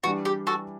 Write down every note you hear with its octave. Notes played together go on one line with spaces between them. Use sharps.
E3 G3 D4 F#4
G4
F#4 A4